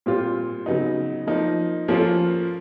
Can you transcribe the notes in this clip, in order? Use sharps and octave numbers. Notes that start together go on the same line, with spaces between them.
A#2 G3 C4 F4
C#3 F#3 B3 D#4
F3 A#3 D#4
F3 A#3 C#4 F4 A4